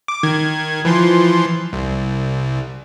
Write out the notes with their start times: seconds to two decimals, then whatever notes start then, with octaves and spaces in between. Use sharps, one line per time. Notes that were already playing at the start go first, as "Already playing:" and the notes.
0.08 D6
0.23 D#3 G#6
0.85 E3 F3 C6
1.73 C2